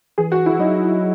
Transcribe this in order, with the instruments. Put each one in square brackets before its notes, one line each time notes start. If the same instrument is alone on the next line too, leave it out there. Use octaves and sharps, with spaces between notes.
[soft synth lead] E3 [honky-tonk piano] G#4
[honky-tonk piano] F#4
E4
[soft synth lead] E3
[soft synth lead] F#3 [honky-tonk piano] D#4